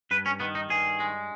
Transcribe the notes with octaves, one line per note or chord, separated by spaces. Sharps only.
G2 B4
C#4
D#3 B3
D#4
G2 G#4
G#3